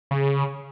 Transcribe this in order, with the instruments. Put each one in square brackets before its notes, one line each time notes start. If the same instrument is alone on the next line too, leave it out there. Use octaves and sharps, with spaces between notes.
[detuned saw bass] C#3